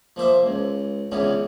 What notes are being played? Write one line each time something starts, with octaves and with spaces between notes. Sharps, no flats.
F3 A#3 C5 E5
C#2
C#2 D3 E3 B3 C#4